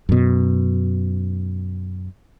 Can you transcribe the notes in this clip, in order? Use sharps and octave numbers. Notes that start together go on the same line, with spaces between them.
F#2 B2